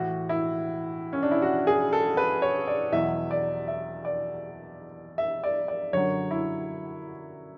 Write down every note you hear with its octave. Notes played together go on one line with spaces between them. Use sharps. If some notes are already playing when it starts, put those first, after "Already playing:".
Already playing: A2 E3 F#4
E4
C#4
D4
E4
F#4
G#4
A4
B4
C#5
D5
E2 B2 F#3 E5
D5
E5
D5
E5
D5
D5
F#2 D3 F#3 C#5
E4